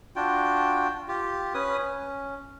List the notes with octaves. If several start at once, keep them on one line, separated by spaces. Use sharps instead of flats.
D4 F4 F#4 G5
F4 G4
C#4 B4 G#5 D#6
C#4